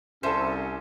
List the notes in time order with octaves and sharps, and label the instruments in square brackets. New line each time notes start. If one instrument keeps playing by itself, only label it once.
[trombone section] C2 [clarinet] C#4 [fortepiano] A4 C5 [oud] E5